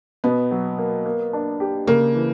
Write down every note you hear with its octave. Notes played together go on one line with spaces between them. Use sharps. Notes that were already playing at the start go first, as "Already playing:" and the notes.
B2 B3
F#3
A#3
A#3
D4
G4
C#3 A#3
E3